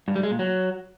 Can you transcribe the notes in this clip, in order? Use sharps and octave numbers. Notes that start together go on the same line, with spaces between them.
G2
G3
G#3
A#2
F#3